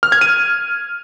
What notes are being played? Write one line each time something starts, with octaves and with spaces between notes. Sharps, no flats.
F6
G#6
D#7